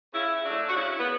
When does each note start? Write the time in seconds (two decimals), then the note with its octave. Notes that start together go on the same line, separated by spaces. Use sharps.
0.13 C#3 E4
0.44 F#3 A3 D4
0.69 F#4
0.76 C#3 E4
1.00 B3